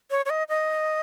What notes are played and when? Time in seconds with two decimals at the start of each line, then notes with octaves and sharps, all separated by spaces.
0.11 C#5
0.26 C#5
0.30 D#5
0.49 D#5